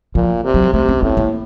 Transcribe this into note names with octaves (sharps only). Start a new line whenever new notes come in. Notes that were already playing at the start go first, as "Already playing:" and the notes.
A#2 F3
C3
F#3
C3 A3
C#4
A2 C4
A#3